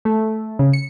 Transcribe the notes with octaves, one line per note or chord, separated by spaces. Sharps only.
A3
C#3
C#7